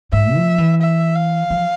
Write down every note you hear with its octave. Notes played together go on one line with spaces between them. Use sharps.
G#2 E5
F3
E3
E5
F5
F3